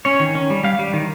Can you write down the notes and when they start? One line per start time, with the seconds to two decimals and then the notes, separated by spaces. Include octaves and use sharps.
0.05 C#4 C#5
0.20 D#3
0.35 C#4
0.50 G3
0.63 G3 F5
0.79 G3
0.93 D#3